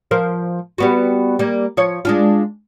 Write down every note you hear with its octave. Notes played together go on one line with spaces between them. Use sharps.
F3 A#4 C5
G3 B3 F#4
G3 A#3
F3 C#5
G#3 D4 F4